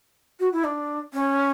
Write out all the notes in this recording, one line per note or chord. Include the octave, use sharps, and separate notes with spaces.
F#4
E4
D4
C#4